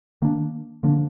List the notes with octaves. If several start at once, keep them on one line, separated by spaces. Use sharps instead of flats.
D#3 A#3 D4
D3 F3 A#3 D4